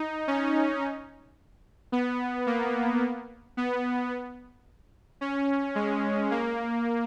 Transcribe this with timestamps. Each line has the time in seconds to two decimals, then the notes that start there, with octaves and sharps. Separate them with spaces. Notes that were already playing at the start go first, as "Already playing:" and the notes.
Already playing: D#4
0.28 C#4
1.92 B3
2.47 A#3
3.57 B3
5.21 C#4
5.75 G#3
6.31 A#3